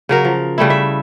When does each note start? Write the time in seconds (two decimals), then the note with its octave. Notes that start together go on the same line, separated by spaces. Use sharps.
0.09 C#3 F#3 A#4
0.25 F3
0.58 C#3 G3 A3 E4
0.70 E5